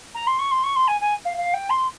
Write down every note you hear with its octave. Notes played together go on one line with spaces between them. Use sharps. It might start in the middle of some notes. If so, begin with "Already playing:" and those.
A#5
C6
C#6
C6
C#6
C6
G#5
G#5
F5
F5
G5
C6